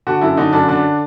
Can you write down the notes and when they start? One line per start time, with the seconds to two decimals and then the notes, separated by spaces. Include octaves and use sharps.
0.07 D3 F#4
0.21 F#2 E4
0.37 D3 D#4
0.53 F#2 D4
0.68 D3 D4